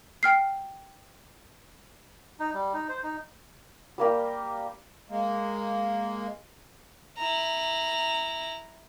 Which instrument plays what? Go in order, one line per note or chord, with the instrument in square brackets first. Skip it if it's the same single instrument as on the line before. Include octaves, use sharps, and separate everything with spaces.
[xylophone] G5 F6 C7
[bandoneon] D#4
G3
D#4
C5
D#4
[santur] G3 A#3 G4
[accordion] G#3 A#3
[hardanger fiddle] E4 A#5